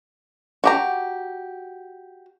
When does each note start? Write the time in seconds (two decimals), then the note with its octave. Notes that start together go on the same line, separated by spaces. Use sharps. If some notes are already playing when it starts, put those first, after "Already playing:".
0.64 F#4 G4 A#5